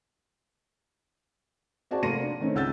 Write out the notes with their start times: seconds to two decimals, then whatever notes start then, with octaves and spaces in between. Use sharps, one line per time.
1.91 C4 F#4 G#4 D5 A5
2.03 F1 A#3 C6 A#6 C#7 D#7
2.23 D4
2.40 D#3 A3 C4 C#4
2.55 C#2 F#5 E6 G6 A6